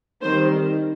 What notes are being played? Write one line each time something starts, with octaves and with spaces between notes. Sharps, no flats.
D#3 G3 C4 C5